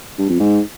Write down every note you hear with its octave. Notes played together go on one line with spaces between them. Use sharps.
G2
F2
G#2